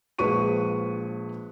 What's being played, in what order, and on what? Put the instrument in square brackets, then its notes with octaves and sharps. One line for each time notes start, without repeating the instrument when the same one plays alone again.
[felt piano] A#1 F3 G#3 B4 C#6 D#7